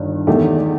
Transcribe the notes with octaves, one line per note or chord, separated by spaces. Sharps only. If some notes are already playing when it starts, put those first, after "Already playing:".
Already playing: G1 G2 D#3
E2 D#3 A3 D#4 G4